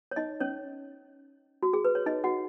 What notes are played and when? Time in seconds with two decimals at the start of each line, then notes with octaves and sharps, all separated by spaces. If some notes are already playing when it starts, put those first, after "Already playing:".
0.11 C#5
0.16 D#4 D#5
0.40 C#4 C#5
1.63 F#4
1.73 G#4
1.85 B4
1.95 C#5
2.06 D#4 D#5
2.24 F#4 F#5